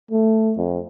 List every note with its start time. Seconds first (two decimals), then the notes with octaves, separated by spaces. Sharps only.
0.11 A3
0.57 F2